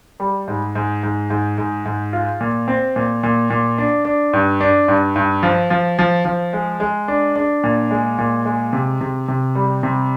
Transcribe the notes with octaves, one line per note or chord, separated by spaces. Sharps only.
G3
G#2
G#2
G#2
G#2
G#2
G#2
F4
A#2
C4
A#2
A#2
A#2
D4
D4
G2
D4
G2
G2
F3
F3
F3
F3
G#3
G#3
D4
D4
A#2
G#3
A#2
G#3
C3
C3
C3
G3
C3